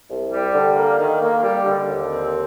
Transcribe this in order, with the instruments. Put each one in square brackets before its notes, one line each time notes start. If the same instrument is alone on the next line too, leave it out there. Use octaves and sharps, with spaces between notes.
[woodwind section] C2
G3
D3
A#3
D#3
A#3
G3
D3
D#2
C4